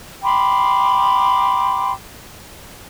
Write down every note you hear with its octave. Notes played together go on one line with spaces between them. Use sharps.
G5 B5 C6 D6